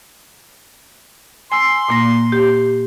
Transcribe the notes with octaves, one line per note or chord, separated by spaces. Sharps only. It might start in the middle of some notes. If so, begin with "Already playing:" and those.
G#5 C6 E6
A#2 A#3 A#6
G4